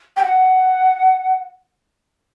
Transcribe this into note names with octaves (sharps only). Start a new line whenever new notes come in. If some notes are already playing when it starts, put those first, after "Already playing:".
G5
F#5